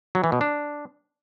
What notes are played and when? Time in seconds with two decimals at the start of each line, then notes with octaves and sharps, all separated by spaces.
0.15 F#3
0.24 E3
0.32 B2
0.41 D4